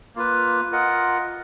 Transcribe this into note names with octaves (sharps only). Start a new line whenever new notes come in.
A#3 F4 B4
F4 A#4 D#5 F#5